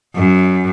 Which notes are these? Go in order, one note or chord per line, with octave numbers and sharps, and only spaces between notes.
F#2